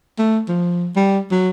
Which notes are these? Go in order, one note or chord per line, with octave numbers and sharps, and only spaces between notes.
A3
F3
G3
F#3